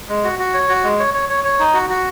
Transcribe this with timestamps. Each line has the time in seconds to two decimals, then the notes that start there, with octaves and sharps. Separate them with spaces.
0.10 G#3
0.24 F#4
0.39 F#4
0.54 C#5
0.69 F#4
0.84 G#3
0.99 C#5
1.14 C#5
1.29 C#5
1.44 C#5
1.59 D#4
1.74 F#4
1.90 F#4